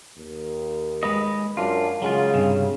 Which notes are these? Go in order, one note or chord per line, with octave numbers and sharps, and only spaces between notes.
D#2
G#3 B4 D#5
F#2 D4 F4
C#3 F#3 G#3 F4
G2 C3